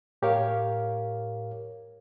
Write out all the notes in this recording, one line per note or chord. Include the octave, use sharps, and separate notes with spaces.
A2 G4 A#4 C#5 F5